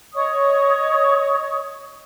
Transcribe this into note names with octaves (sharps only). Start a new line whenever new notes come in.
C#5 D#5 C#6 D#6